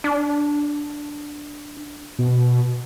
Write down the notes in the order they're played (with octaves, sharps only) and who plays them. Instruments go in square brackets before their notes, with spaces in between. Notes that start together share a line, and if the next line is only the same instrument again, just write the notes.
[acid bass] D4
[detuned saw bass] B2